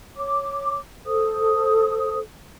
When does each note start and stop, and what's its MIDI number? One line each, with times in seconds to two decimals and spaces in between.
0.16 0.77 73
0.16 0.77 86
1.06 2.19 69
1.06 2.19 72
1.06 2.19 87